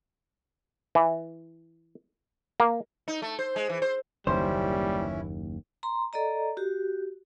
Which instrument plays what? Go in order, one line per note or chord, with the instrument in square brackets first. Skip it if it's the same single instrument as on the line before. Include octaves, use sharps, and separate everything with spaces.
[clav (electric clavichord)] E3
A#3
[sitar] D#4
A3
C5
G#3
E3
C5
[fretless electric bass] F#1 D#2 [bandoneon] E3 C#4 E4 [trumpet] G3 [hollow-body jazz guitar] C5
[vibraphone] A#5 C6
A4 D5 D#5 A#5
F#4 G4